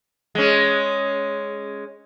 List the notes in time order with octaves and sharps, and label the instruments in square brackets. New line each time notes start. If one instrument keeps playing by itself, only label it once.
[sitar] G#3 C#4